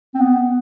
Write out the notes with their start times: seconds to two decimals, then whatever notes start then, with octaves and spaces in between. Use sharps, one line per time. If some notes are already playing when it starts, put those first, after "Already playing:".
0.15 C4
0.21 B3